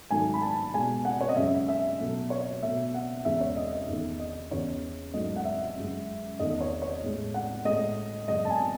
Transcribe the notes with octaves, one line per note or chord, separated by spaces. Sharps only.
G#2 D#3 F#3 A3 G#5
B5
A5
B2 G#3 G#5
F#5
C#5
D#5
F#2 C#3 G#3 E5
E5
B2 F#3 A3
C#5
B2 A3 E5
F#5
E2 C#3 E3 G#3 E5
C#5
D#5
D#5
E2 D#3 A3
D#5
E2 C#3 E3 C#5
G#2 F#3 A3 D#5
F#5
E5
F#2 C#3 G#3
E2 D#3 A3 D#5
C#5
C#5
A2 G#3
F#5
A2 G#3 D#5
F#2 C#3 G#3 D#5
A5
G#5